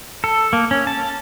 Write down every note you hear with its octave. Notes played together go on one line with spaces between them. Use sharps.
A4
A#3
C#4
A5